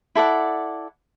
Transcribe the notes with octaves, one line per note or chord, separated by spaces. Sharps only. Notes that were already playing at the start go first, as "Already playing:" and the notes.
E4 A4 D5 F#5